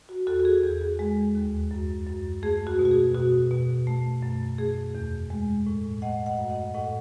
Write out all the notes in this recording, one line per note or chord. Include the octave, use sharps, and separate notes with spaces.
F#4
E2 F#4 A4
F#4
G#4
E2 G#4
G#4
G#3 G#4
D#2
F#2
F#2
A3 G#4
F#4
B2
F#4
G#4
B2 F#4
B2
A3
F#2
A3 G#4
E2
G#3
A2
A3 D#5 F#5
D#5 F#5
F#2
D#5 F#5
A2 D#5 F#5